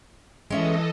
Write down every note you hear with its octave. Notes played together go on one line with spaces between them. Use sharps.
E3 G#3 C#4 A4 D#5 E5